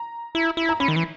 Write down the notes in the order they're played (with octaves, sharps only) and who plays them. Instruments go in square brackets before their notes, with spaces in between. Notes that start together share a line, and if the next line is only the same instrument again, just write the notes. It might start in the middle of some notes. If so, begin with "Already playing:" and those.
Already playing: [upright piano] A#5
[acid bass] E4
E4
[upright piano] A#5
[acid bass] C#4 [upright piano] B5
[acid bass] D#3
E3